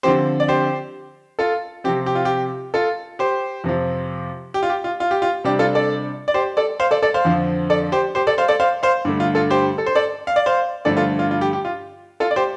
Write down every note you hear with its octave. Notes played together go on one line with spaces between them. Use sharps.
D3 F3 C4 G4 C5
D5
G4 C5
F4 A4
C3 F3 C4 G4
G4
F4
G4
F4 A4
G4 C5
F2 C3 F3
G4
F4
G4
F4
F4
G4
F4
C3 G3 D4 G4
F4 A4
A4 D5
D5
G4 C5
A4 D5
C5 F5
A4 D5
A4 D5
C5 F5
F2 D3 F3
A4 D5
G4 C5
G4 C5
A4 D5
C5 F5
A4 D5
C5 F5
C5 F5
G2 D3 A3
F4
F4 A4
G4 C5
A4
C5
A4 D5
F5
D5
C5 F5
G2 D3 F3 A3 A4 D5
F4 A4
F4
F4
G4
G4
F4
F4 A4
D5
G4 C5